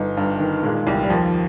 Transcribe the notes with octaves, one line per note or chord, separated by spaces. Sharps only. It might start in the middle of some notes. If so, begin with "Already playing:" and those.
Already playing: G1 D#4
G2
D#3
A#2 G#3
C2 G3
G3
D#2 F3